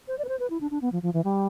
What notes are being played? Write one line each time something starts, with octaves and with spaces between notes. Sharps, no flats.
C5
D5
B4
C5
B4
E4
D4
D4
B3
F3
F3
E3
G3